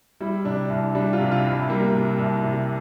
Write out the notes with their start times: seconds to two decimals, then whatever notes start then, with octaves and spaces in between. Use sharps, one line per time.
0.20 G3 E4
0.45 C3 D4
0.69 C2
0.95 G3 D4
1.13 F4
1.19 C3
1.32 F4
1.44 C2
1.51 E4
1.69 G3 A#3
1.94 C3
2.18 C2
2.43 C3